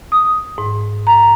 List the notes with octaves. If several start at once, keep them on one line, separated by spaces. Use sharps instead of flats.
D#6
G#2
A#5